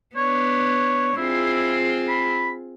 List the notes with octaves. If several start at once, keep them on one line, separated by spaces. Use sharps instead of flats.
B3 D4 C#5
C4 E4 F4 G#4
B5